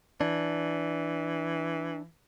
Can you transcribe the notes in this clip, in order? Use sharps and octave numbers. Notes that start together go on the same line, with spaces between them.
E3 D4